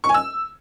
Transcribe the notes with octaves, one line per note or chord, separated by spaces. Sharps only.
C#6
G#5
E6